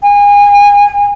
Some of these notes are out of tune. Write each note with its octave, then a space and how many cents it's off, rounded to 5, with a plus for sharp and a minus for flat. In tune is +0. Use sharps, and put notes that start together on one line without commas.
G#5 -30